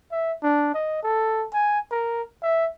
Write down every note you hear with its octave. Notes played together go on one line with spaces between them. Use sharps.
E5
D4
D#5
A4
G#5
A#4
E5